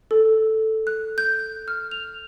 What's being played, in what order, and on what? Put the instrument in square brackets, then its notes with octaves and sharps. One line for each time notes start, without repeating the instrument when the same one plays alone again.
[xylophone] A4
F#6
G6
F6
F7